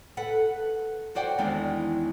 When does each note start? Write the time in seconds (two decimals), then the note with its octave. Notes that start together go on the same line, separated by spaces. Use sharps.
0.17 A4 B4 F#5
1.15 F#4 C5 D5 F#5 G5
1.38 E2 D#3 E3 G#3 C4 D4